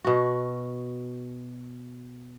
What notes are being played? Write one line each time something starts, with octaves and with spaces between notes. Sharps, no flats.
B2 F#4